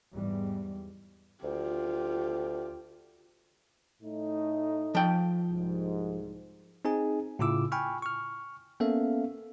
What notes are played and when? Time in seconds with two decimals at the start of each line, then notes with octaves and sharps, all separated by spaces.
0.11 E2 G#2 G3
1.43 D2 F4 G4
4.02 A2 A3 D#4
4.95 F3 G5
5.50 C2 G#2
6.85 C4 D#4 G#4 G#5
7.39 A2 C#3 E4 F4 D6 E6
7.72 G5 G#5 B5 C#6 F6
8.02 C#6 F6
8.80 A#3 B3 C#4 A4 E5 F5